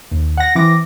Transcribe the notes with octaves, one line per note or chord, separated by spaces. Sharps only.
D#2
F#5 A#6
E3 C4 D6 A#6